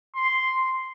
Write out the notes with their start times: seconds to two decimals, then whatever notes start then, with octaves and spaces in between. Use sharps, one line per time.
0.15 C6